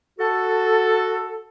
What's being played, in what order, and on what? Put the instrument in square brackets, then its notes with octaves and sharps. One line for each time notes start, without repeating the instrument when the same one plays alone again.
[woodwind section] F#4 A4